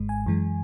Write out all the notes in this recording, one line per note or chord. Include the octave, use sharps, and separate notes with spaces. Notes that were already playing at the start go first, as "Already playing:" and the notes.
Already playing: G#1 G#2 G#3
G#5
F#2 E3 G#3